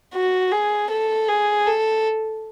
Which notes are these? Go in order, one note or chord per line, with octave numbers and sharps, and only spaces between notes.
F#4
G#4
A4
G#4
A4